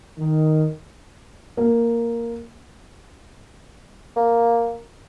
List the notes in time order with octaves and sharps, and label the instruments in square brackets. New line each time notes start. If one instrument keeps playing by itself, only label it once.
[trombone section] D#3
[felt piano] A#3
[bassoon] A#3